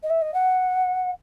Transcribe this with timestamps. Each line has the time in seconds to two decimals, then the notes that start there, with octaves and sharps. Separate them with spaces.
0.03 D#5
0.10 E5
0.21 D#5
0.33 F#5